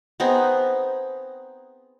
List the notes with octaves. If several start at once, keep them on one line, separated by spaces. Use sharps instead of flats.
B3 C4 D#4 G#4